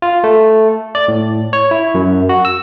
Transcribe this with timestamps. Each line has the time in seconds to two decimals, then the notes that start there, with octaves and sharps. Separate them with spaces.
0.02 F4
0.24 A3
0.95 D5
1.08 A2
1.53 C#5
1.71 E4
1.95 F#2
2.29 F#4
2.45 E6